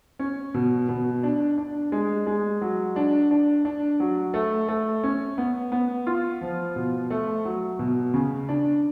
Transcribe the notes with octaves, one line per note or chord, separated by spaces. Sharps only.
C#4
B2
B2
D4
D4
G#3
G#3
F#3
D4
D4
D4
F#3
A3
A3
C#4
B3
B3
F4
F3
B2
A3
F#3
B2
C#3
D4